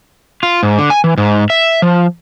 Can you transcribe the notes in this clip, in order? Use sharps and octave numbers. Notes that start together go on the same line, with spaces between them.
F4
G#2
D3
G#5
E3
G#2
E5
F3